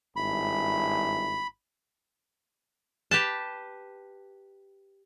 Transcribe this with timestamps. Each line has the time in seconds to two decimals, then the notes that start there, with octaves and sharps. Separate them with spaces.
0.16 G#1 G2 E4 B5
3.11 G4 B4 A5